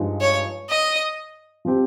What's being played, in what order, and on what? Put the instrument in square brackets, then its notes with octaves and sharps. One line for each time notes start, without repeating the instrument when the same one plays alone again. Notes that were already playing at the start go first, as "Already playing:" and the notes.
Already playing: [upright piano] G2 F3 G#3 D#4
[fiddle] C#5
D#5
[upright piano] F3 C4 G4